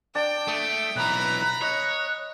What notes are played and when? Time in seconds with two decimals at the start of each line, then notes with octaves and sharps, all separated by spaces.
0.15 D4 G5 A5
0.48 A3 D#6
0.96 B1 E3 A#5 B5 F#6
1.61 C#5 D#5 F#6